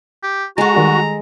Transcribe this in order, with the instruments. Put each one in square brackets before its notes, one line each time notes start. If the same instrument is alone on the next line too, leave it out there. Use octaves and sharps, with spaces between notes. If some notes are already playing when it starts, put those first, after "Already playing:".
[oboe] G4
[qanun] G#3 A4 [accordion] F#4 [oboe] A#5
[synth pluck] D#3 G3